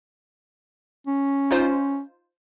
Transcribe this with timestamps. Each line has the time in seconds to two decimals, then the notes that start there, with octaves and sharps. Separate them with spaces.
1.07 C#4
1.51 D#4 F4 C5